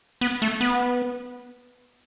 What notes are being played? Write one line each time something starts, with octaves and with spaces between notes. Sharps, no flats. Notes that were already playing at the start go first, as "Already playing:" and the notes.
B3
A3
B3